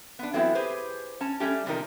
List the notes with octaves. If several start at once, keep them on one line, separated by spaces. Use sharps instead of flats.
B3 D4
E3 F#3 A3 B3 C4 E4
G4 G#4 B4 C5
C#4 A5
G3 A3 C#4 G4
E2 C3 D#3 F3 D#4 A#4